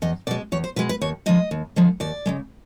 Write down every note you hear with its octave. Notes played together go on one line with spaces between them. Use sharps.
E2 D#5
B2 G#3 D5
E2 C#5
C5
B2 G#3 B4
B4
D#2 C#5
D3 F3 G#3 D#5
D#2
D3 F3 G#3
D#2 D5
C#3 E3 G#3